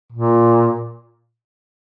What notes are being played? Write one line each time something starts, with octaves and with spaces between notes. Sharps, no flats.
A#2